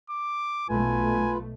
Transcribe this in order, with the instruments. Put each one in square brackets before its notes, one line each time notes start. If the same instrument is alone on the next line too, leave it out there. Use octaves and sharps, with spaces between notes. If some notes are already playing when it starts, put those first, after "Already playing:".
[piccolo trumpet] D6
[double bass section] B1 B2 A3 [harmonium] F4 B4 [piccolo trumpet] G#5